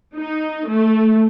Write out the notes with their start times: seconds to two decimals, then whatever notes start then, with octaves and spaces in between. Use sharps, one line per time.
0.15 D#4
0.68 A3